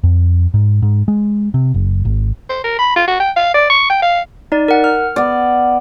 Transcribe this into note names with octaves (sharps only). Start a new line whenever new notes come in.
F2
G#2
G#2
G#3
C3
F#1
G#1
C5
A#4
B5
F4
F#4
G5
F5
D5
C#6
G5
F5
D#4 D5
A#4 F#5
F6
B3 D5